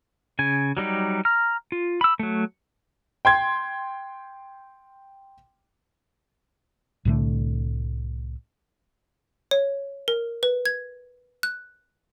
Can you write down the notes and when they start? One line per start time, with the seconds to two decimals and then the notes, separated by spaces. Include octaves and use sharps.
0.39 C#3 G#5
0.77 F#3 G3 D#4 G4
1.25 A#5 F6
1.72 F4
2.01 B5 E6
2.19 F#3 A3
3.25 G5 C6 G#6
7.05 C2 A2 D3 A3
9.51 C#5
10.08 A#4
10.43 B4
10.66 G#6
11.43 F#6